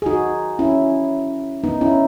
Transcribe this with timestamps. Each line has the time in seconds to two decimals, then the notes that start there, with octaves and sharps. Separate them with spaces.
0.02 G#4
0.06 D#4 F#4
0.59 C#4 E4
1.64 B3 D#4
1.81 C#4 E4